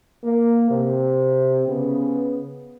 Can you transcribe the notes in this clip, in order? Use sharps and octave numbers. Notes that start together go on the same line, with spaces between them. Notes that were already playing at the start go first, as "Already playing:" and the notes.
A#3
C3
C#3 B3